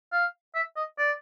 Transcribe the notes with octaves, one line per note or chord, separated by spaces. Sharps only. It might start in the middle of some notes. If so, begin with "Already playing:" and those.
F5
E5
D#5
D5